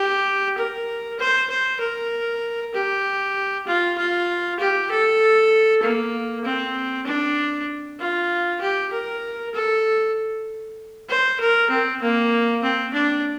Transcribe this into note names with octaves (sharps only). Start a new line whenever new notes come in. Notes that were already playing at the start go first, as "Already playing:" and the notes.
Already playing: G4
A#4
C5
C5
A#4
G4
F4
F4
G4
A4
A#3
C4
D4
F4
G4
A#4
A4
C5
A#4
C4
A#3
C4
D4